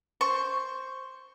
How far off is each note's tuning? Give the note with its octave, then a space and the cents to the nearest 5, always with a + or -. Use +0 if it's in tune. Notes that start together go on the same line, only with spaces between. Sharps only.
C5 +0 C#6 +0